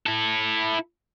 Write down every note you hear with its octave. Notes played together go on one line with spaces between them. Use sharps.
E4 A4